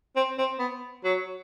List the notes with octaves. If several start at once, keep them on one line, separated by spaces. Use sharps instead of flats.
C4
C4
B3
F#3